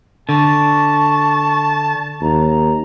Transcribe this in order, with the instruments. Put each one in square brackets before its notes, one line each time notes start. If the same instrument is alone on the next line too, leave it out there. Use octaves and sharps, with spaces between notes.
[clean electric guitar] D3 [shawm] A5 [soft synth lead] C#6
[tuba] D#2 [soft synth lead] A#5